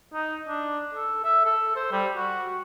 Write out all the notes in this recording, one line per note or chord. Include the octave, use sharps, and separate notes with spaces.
D#4
D4
A4
E5
A4
C5
G3
F#4